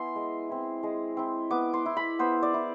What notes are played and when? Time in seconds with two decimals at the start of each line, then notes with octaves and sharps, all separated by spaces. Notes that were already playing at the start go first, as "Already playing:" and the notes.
Already playing: B3 E4 G#5 C6
0.16 G#3
0.49 C4 E4
0.83 G#3
1.17 C4 E4
1.51 B3 D6
1.74 C6
1.86 E4
1.97 B5
2.19 B3 C5
2.43 D5
2.54 E4